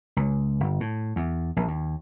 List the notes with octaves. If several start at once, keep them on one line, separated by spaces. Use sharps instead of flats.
C#2
G1
A2
E2
A#1
D#2